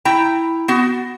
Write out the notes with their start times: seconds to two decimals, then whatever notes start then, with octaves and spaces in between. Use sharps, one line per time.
0.05 E4 G5 A#5
0.68 B3 F#4